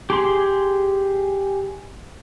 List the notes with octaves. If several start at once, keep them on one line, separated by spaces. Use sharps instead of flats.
G4 G#4 C6